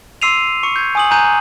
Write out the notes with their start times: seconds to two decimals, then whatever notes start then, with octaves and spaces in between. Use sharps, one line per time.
0.22 C6 D6 E6 C7 D#7 F7
0.63 C#6 C#7
0.76 G6 G#6
0.95 G#5 D#6 F#7
1.11 G#5 A#5 F#6 G6 D#7